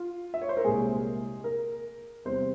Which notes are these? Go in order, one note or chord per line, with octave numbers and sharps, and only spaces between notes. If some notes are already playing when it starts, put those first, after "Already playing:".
Already playing: F4
E5
C#5
C5
A#4
C2 A#2 G#3 G#4
A#4
E2 C3 G3 C4 C5